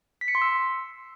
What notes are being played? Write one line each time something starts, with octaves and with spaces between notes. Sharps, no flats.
B6
C#7
C6
E6